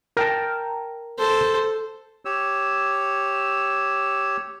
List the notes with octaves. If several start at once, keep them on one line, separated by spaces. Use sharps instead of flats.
A#4 G5 A5
A4 C5
G4 C#5 E6